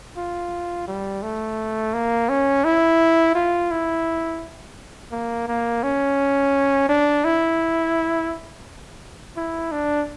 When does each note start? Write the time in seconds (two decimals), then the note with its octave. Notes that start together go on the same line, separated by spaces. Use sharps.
0.17 F4
0.88 G3
1.22 A3
1.94 A#3
2.29 C#4
2.65 E4
3.35 F4
3.71 E4
5.12 A#3
5.48 A#3
5.83 C#4
6.89 D4
7.25 E4
9.37 E4
9.72 D4